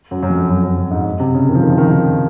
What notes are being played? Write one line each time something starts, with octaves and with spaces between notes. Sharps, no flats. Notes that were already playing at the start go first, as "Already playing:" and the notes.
F#2
F#2
F2
F#2
F#2
F#2
G#2
C3
C#3
D#3
F3
D#3
F3
D#3
F3
D#3